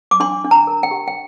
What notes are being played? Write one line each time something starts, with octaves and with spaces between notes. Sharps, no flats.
D6
D4 C6
D4
A#5
A#4
G5
G4
G5